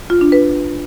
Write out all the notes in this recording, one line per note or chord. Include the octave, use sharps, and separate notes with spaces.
F4
D4
B4